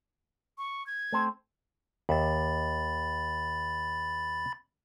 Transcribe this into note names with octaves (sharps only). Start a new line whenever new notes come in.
C#6
G#6
A3 C4 C5
D#2 E5 B5 A6